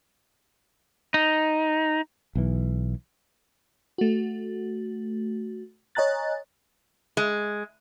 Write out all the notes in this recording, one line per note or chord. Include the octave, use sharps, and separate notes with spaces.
D#4
B1 E3
A3 F#4
C#5 D#5 G#5 A#5 F#6 A6
G#3